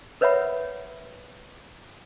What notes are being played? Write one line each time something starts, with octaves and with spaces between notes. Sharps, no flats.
A#4 B4 C#5 E5 F#5 B5